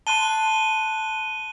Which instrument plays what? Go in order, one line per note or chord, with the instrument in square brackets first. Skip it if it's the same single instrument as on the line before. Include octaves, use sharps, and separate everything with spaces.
[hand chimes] A5 C6 [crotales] F#6 D#7 G7